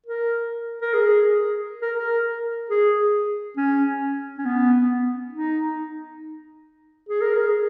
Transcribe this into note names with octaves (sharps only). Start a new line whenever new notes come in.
A#4
A#4
G#4
A#4
A#4
G#4
C#4
C#4
B3
D#4
G#4
A#4
G#4